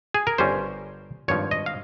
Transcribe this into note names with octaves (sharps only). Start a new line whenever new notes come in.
G#4
A#4
G1 G2 G3 C#4 C5
G#1 G2 F3 C#5
D#5
F5